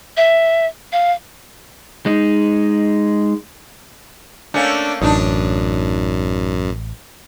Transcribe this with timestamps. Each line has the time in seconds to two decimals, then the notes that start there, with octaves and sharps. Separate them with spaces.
0.17 E5
0.92 F5
2.06 G#3 D#4
4.54 A3 A#3 C#4 D4
5.02 A1 F#2 D4 D#4